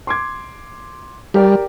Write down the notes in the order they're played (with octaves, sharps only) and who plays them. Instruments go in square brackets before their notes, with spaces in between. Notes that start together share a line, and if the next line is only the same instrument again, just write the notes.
[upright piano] C6 D6 G#6
[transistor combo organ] G3 [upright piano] G4 A#4 D5